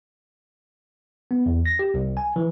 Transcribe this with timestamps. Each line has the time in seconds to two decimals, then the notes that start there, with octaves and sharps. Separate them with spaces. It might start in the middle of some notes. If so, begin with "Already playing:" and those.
1.31 B3
1.46 E2
1.66 A#6
1.79 G4
1.94 C2
2.17 G#5
2.36 E3